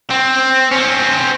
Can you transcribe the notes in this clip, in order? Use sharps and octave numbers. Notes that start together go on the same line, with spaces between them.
C4
C4 C#4